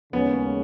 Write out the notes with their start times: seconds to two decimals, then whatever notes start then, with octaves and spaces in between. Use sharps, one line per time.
0.13 D#2 C#3 G#3 B3 C#4